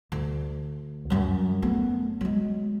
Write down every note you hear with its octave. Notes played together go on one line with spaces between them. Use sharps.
D2
F#2 F#3
A3 B3
F#3 G#3